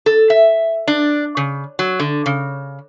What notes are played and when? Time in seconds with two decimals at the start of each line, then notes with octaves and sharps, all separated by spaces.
0.06 A4
0.30 E5
0.88 D4
1.37 C#3
1.79 F#3
2.00 D3
2.26 C#3